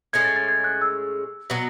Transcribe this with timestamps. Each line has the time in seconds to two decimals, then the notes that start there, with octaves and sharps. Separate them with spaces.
0.13 A2 G#3 C#4 G#4 G#6
0.25 A6
0.36 A6
0.48 G#6
0.64 F#6
0.81 E6
1.50 B2 F#3 B3